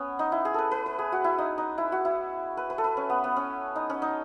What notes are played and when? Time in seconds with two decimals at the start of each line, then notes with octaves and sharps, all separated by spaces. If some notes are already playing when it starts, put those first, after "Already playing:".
Already playing: B3 C#4
0.19 D#4
0.32 E4
0.45 G#4
0.54 A4 B4
0.71 B4
0.86 B4
0.99 G#4
1.12 F#4
1.24 E4
1.38 D#4
1.58 D#4
1.78 E4
1.92 F#4
2.05 E4
2.57 B4
2.70 B4
2.78 A4
2.84 B4
2.97 C#4
3.09 B3
3.24 B3
3.36 C#4
3.76 D#4
3.90 C#4
4.02 D#4